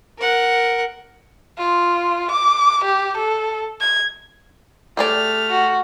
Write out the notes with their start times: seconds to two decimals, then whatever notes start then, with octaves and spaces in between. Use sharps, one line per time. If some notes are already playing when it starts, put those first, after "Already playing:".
0.19 A#4 F#5
1.58 F4
2.31 D6
2.84 G4
3.17 A4
3.81 G#6
4.97 A3 G4 G#4 D5 F6
5.50 F#4